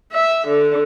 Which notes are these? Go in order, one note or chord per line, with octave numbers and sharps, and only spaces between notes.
E5
D3